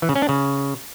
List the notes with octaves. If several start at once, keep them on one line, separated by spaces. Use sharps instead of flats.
E3
C#3
C#4
D4
C#3